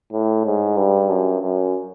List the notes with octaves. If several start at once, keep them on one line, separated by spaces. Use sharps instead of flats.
A2
G#2
G2
F#2
F#2